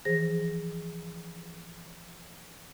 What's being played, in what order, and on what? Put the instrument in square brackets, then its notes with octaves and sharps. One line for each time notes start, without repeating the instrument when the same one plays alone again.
[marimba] E3 F3 G#4 C5 A#6